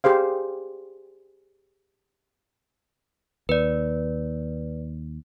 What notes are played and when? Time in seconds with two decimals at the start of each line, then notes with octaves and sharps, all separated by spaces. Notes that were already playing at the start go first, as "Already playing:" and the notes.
0.04 G4 G#4 C5 F5
3.49 D#2 B4 D5